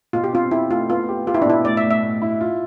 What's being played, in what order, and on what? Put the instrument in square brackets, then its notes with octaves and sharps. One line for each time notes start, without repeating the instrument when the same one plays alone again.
[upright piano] B2 [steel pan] F4
[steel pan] G4
[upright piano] C4 [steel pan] F4
[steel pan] E4 [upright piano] G4
[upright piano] A3 [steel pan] F4
[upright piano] B3 [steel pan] F4
[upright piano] G4
[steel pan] F4 [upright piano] G4
[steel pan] E4
D4
[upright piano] B2 [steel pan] E4
[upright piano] A2 [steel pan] D5
[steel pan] E5
[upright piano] A2
[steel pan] E5
[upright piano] A2
E4
F4